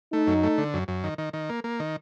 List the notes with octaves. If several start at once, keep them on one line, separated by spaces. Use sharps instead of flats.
A3 D#4
F#2
A3
D3
F#2
F#2
D#3
D#3
D#3
A#3
A#3
D#3